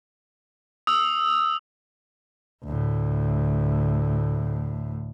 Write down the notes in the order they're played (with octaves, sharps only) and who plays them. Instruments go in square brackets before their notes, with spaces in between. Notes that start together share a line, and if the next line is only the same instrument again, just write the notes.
[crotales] D#6 E6
[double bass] D2 A2